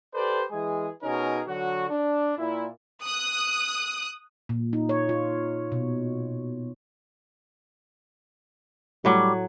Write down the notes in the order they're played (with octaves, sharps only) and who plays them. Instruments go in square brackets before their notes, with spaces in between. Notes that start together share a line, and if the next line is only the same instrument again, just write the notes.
[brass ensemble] G4 A4 B4 C5 D5
E3 G#3 G#4
B2 C#4 D#4 G#4 A#4
D3 F#3 F#4
D4
A#2 E4
[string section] D#6 F#6
[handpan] A#2
D#4
C#5
F4
B2
[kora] A2 F#3 [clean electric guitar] G3